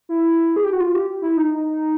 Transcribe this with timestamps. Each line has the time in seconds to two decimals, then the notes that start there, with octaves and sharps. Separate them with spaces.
0.09 E4
0.56 G#4
0.64 G4
0.73 F#4
0.80 F4
0.95 G4
1.22 E4
1.37 D#4